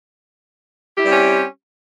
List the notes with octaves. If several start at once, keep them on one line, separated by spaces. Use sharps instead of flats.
G3 C4 C#4 E4 G4